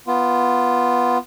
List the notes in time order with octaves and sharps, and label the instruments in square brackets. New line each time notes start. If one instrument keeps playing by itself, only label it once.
[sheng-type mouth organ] B3 F4